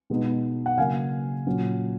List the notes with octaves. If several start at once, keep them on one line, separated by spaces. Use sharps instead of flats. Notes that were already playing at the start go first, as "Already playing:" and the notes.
B2 G#3 B3 D#4
F#5
C#3 F#3 A#3 F5 G#5
A#2 F#3 C#4